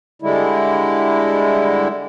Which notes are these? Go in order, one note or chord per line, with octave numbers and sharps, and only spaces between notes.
D3 G3 G#3 E4